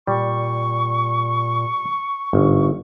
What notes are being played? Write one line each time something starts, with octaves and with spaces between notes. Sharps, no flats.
A#2 G3 C#6
G1 G#2